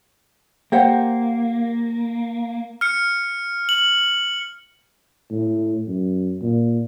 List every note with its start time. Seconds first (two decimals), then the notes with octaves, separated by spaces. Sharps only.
0.72 A#3 G4 C5 F#5
2.81 F6 C#7
3.69 F#7
5.31 A2
5.87 F#2
6.42 A#2